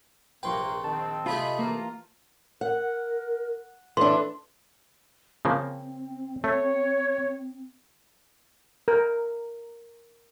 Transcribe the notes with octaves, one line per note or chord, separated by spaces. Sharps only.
A#1 C3 A#3 B4 G5 C6 C#6
D#3 C4 A5
C3 A3 F4 G#4 D#5 B5
E3 A#3 F4 A#5
A#4 F#5
E3 D4 A4 C6
C#3 F3 A#3 C4
A3 C#5
A#4